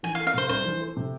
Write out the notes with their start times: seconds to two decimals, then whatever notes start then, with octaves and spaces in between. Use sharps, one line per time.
0.03 E3 G#5
0.15 F5
0.19 A3
0.27 F5
0.34 C3 C5
0.49 C2 C5
0.65 E3
0.80 A3
0.97 C3